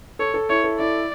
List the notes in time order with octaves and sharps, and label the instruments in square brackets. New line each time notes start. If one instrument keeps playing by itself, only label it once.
[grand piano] A4 [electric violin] C#5
[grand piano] A4
[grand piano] E4 [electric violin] C#5
[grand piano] A4
[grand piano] E4 [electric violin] D5